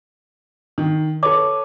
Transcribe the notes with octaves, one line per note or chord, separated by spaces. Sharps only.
D#3
A4 B4 C#5 D6